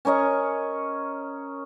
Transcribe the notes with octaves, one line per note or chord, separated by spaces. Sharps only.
C#4 A#4 C#5 D#5